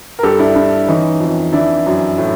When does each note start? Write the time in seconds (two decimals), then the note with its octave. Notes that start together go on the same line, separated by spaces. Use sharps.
0.19 A#4
0.23 G2 G4 A4
0.39 D4 E4
0.55 G2 D4
0.87 E3 C#4 D#4
1.20 F2
1.53 E3 D4 E4
1.86 F#2
2.18 A2